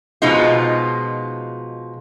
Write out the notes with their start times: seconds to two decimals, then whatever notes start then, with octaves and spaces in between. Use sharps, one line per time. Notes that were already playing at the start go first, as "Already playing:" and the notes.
0.22 B2 F3 G#3 D#4 F4